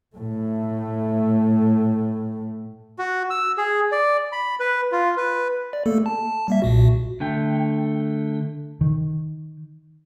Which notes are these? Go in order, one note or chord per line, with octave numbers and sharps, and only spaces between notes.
A2 A3
F#4
E6
G#4
D5
B5
B4
F4
B4
D5
A3 A#3 A4
A5
G3 A#3 E5
B1 A#2 F#4
D3 A3 G5
D#3